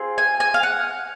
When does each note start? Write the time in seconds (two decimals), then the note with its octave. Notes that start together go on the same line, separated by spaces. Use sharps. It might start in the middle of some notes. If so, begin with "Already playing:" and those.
Already playing: C4 F4 G#4
0.18 G#5
0.40 G#5
0.54 F5
0.63 F#5